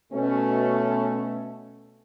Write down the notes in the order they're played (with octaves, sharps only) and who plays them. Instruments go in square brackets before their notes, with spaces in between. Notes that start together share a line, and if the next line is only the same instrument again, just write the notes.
[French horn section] B2 A3 C#4